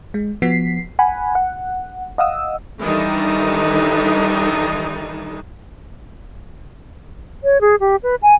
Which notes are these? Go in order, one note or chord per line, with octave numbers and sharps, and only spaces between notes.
G#3
F3 B3 F#4 B6 C7
F#5 G#5 B5
F#5
D#5 F5 F#5 D#6 E6
D#3 E3 G3 D4 D#4 A4
C#5
G#4
G4
B4
G#5